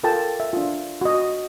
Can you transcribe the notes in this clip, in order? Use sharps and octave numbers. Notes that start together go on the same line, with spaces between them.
F4 A4 A#4 G5 A5
E5
D4 F4
F#4 D#5